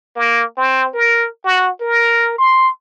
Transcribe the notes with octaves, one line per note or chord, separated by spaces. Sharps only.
A#3
C4
A#4
F#4
A#4
C6